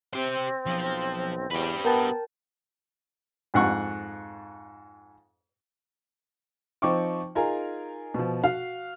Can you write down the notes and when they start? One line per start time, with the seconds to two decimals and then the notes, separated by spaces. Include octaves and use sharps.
0.14 C3 C4 G4 C5
0.66 B1 F3
1.51 E2 G4 B4
1.85 B3 A#4 G5 A5
3.54 F2 G#2 F#5 C#6 F#6
6.82 F3 C4 D#4 G5 C#6 D6
7.35 D#4 F4 G#4 A#4 G#5 A#5
8.14 B2 F3
8.44 F#4 F5 F6